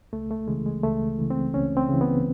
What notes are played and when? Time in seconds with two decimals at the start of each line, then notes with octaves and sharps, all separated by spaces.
0.13 C#2 A3
0.31 A3
0.48 C#3 E3 G#3
0.66 G#3
0.83 C#2 A3
1.19 C#3 E3
1.30 C4
1.54 C#2 C#4
1.77 C4
1.89 C#3 E3
2.01 B3